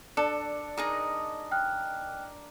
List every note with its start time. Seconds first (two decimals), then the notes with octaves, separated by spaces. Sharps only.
0.17 D4 A4 D5 C#7
0.77 D#4 G#4 A#4 D#5
1.51 G5 F6 F#6